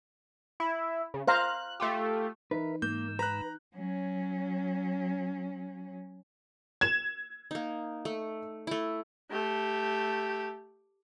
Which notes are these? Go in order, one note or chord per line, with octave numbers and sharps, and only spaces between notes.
E4
C#3
C5 F5 A#5 F#6
A3 F4 G4
E3 D#4 A#4 B4 E5
G#2 A#3 E6 G6
B4 A#5 F#6
F#3 C#4
G#6 E7
A#3 D#4
A3
A3 E4
A3 G4